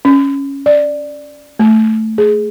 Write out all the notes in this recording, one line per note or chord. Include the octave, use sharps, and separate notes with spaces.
C#4
D5
A3
G#4